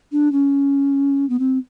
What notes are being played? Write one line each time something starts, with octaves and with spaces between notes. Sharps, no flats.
D4
C#4
B3
C4